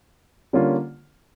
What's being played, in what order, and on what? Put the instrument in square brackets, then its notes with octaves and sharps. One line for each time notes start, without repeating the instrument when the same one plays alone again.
[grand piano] D3 G3 A#3 C#4 F4